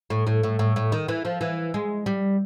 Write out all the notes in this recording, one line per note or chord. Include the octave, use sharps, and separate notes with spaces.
A2
A2
A2
A2
A2
D#3
E3
F3
E3
G#3
G3